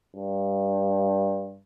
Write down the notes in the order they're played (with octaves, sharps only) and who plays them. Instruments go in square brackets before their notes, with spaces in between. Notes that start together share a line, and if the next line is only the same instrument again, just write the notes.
[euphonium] G2